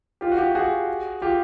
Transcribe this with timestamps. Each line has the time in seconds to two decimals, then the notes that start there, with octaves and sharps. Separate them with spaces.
0.21 F4 G4
0.32 F#4
0.38 F4 G4
0.55 F#4 G#4
1.22 F4 G4